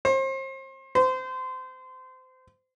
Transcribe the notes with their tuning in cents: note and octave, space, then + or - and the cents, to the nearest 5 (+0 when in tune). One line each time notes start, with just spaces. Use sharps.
C5 +35
C5 -25